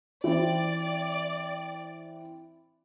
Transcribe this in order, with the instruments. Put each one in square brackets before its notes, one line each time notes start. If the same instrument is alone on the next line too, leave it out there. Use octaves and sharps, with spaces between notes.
[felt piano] E3 C4 [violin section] D5